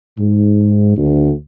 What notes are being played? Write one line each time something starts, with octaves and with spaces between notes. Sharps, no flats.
G#2
D2